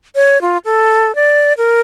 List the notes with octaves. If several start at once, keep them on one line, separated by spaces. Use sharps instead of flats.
C#5
F4
A4
D5
A#4